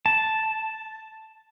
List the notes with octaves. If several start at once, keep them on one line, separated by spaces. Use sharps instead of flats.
A5